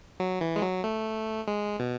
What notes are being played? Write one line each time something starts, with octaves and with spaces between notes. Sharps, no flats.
F#3
E3
G#3
F#3
A3
G#3
B2